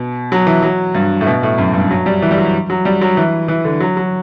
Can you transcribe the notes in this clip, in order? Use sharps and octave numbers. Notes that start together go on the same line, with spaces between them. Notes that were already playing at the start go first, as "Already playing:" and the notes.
Already playing: B2
F#3
E3
F#3
G2
A2
B2
A2
F#2
G2
F#3
G3
E3
G3
F#3
F#3
G3
F#3
E3
E3
D3
F#3
F#3